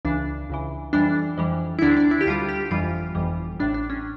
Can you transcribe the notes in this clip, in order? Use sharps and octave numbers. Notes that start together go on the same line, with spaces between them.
C#2 C#3 E3 D4
C#2 C#3 E3
F2 E3 G3 D4
F2 E3 G3
E4
D2 D3 G3 D4
D4
E4
G4
D2 D3 G3 F4
G4
G1 F2 E3 G3 F4
G1 F2 E3 G3
A1 A2 G3 D4
D4
C#4